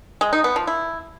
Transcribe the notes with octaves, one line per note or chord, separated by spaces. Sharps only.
G#3
D#4
B3
F3
E4